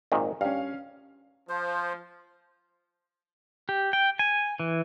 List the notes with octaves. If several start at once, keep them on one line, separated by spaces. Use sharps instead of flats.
G#1 A#2 D#3
G2 C#4 F5
F3 C5
G4
G5
G#5
E3